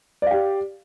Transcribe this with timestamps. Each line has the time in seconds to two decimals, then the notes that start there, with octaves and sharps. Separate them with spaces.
0.22 D5
0.27 F5
0.31 G4